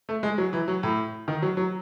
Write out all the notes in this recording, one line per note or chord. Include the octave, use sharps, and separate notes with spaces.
A3
G#3
F#3
E3
F#3
A2
D#3
F#3
F#3